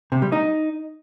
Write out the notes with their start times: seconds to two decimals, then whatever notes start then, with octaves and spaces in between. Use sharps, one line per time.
0.12 C3
0.22 G3
0.32 D#4